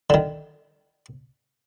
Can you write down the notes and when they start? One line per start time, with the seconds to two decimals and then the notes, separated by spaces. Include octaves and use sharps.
0.10 D3 D#3